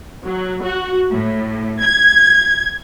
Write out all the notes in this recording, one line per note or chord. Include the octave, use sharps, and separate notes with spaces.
F#3
F#4
A2
G#6